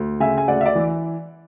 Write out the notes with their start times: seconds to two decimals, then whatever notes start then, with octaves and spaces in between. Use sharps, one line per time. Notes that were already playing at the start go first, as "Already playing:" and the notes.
Already playing: D2
0.20 C#3 E5 G#5
0.38 G#5
0.47 D2 D5 F#5
0.61 E5
0.66 D5
0.75 E3